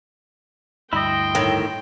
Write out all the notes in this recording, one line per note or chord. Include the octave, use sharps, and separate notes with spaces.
D2 G2 E4 D#5 G5 C6
A2 D#3